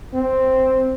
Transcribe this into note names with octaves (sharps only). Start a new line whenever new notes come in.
C4